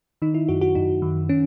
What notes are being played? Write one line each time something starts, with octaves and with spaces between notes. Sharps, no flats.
D#3 D#4
E4
F#2 F#4
F#4
F#2 D#4
D#3
C#4